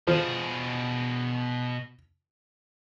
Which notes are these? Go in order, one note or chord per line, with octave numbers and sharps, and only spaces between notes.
B2 F3 G#4